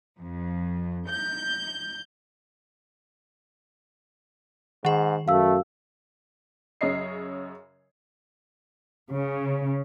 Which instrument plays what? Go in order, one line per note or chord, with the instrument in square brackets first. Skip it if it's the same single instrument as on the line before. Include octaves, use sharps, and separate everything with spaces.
[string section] F2
G6
[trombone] G#2 [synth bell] D#3 G#4 [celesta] F#5
[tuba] F#2 [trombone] A3 [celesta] F5 E6
[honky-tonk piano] F#2 C#3 C#5 D#5 C7
[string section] C#3